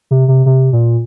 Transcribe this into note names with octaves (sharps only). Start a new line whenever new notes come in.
C3
C3
C3
A#2